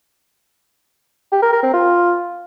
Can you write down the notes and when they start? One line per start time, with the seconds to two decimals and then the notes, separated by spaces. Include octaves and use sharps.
1.32 G4
1.42 A#4
1.53 A#4
1.63 C4
1.74 F4